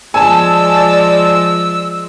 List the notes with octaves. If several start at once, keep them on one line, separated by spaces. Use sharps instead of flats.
F3 G#3 D5 G#5 A5 E6